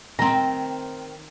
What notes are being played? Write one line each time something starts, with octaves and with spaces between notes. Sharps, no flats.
D#3 C4 A#5